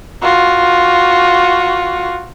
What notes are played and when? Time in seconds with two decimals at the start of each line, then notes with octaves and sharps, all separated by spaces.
0.23 F4 F#4